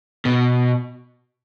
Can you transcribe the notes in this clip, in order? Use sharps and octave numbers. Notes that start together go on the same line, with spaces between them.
B2